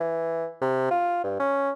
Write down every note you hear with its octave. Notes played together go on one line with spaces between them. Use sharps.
E3
C3
F4
G2
C#4